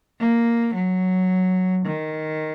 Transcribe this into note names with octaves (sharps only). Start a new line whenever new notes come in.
A#3
F#3
D#3